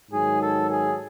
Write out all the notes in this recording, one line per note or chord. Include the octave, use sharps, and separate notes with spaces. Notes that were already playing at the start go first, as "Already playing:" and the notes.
G#2 D#3 F#3 G#4
A4
G#4